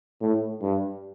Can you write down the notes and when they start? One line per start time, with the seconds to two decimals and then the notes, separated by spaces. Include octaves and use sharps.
0.21 A2
0.62 G2